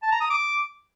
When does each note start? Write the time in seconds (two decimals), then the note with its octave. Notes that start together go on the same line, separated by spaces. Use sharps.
0.03 A5
0.12 A#5
0.21 D#6
0.30 D6